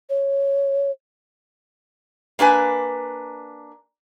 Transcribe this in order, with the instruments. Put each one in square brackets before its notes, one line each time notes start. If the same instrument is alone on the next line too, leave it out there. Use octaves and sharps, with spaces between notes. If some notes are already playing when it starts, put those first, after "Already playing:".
[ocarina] C#5
[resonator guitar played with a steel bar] A#3 D4 B4 G#5